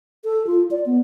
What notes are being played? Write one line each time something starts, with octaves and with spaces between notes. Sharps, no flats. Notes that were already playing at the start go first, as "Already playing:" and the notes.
A4
F4
D5
B3